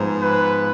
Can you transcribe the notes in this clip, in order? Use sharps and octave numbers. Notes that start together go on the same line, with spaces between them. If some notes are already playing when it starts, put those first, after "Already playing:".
Already playing: G#2 F3 B3
B4